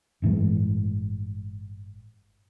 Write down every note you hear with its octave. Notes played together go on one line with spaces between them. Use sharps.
G1 A2 E3 G#3